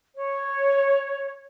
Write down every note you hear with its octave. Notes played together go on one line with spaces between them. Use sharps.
C#5